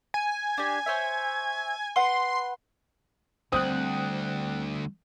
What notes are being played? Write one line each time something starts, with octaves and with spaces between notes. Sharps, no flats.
G#5
D4 G4
C5 C#5 E5
B4 F#5 C6
D2 G3 C4 G5 D#6 F#6